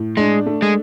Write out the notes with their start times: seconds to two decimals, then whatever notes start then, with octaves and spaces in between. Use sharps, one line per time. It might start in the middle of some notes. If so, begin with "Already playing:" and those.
Already playing: A2
0.17 G#3 D4
0.46 A3
0.62 G#3